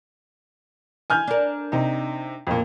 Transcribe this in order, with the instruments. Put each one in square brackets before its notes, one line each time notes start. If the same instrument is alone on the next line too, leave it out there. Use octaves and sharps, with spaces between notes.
[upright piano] G#5 F6 G6
[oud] D4 A#4
[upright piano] C3 D#4
F2 A#2